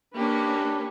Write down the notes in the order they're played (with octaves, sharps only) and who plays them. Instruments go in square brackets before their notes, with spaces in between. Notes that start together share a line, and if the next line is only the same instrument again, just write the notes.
[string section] A#3 C#4 [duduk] D4 [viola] G4 B4